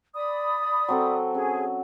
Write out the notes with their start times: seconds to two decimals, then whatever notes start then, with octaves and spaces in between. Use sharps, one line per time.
0.15 D5 B5 D#6
0.88 F#3 C4 A4
1.35 C#4 G#4